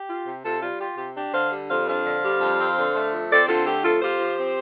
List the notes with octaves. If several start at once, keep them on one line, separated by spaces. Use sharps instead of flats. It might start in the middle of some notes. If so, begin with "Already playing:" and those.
Already playing: G4
F4
C3
C3 F4 A4
G3 F4
F4 G4
C3 G4
D4 G4
D3 C5 F5
G3
F2 C5 F5
D4 C5 F5
D3
G3
F2
C4
D3
A3
F2
C4 A4 D5
D3 F4 A4
A3 G4
F2 F4 A4
F4 G4 C5
F3
C4